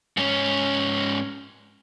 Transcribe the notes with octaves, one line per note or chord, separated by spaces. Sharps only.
G#2 C#4